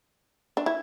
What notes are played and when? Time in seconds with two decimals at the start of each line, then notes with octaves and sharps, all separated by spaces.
0.57 D4
0.66 E4